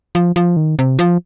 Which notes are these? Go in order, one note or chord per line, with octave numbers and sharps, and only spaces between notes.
F3
F3
D#3
C3
F3